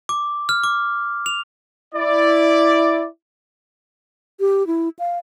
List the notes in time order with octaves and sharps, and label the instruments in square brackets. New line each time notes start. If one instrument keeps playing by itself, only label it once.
[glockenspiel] D6
F6
D6
F7
[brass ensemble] E4 D5
[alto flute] G4
E4
F5